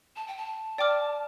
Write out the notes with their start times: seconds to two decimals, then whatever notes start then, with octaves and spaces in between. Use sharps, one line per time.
0.16 A5
0.27 G5
0.37 A5
0.78 D5 G5 D6 F6